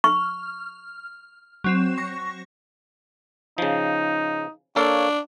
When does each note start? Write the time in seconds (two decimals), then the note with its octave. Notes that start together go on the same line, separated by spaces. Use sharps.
0.04 C#6 F6
1.64 F#3 C4 E7
1.98 C#6 A#6
3.58 C#3 F3 D#4
4.76 A#3 D4 A4 C#5 F5